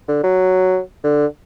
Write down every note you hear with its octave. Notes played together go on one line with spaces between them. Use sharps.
D3
F#3
D3